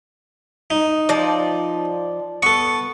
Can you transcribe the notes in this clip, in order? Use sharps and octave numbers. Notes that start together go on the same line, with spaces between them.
D#4
F3 D5
B3 A4 C#6